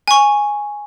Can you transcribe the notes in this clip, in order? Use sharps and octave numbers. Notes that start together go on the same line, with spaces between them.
G#5 C#6